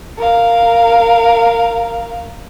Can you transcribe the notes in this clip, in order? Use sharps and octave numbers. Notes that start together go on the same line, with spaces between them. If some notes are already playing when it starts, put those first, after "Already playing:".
A#4 F5